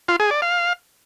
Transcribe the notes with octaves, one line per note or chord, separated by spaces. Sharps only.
F4
G#4
D5
F5